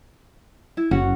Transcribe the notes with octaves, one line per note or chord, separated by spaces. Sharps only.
E4
F#1 C#4 F#4 F#5